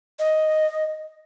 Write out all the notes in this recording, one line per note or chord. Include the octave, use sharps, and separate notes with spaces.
D#5